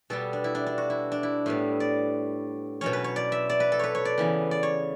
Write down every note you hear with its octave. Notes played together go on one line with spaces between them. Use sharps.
B2 G3 B3 A4
D4
E4
D4
D4
F#4
E4
D4
E4
A2 G3 B3
D5
B2 F#3 C#4 C#5
B4
C#5
D5
E5
D5
B4
A4
B4 C#5
C#5
D5
C#3 E3 B3
D5
C#5